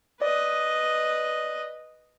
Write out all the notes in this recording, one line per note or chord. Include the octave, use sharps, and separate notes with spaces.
B4 D5 D#5